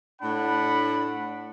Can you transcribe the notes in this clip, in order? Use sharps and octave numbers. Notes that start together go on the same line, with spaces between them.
A2 D4 F#5 B5